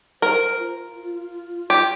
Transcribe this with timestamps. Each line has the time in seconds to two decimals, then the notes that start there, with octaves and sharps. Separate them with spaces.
0.22 A#4 C5
0.59 F4
1.70 G4